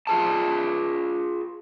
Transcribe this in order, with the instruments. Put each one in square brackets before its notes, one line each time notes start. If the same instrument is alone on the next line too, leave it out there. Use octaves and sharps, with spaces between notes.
[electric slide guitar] F4 G#4 A5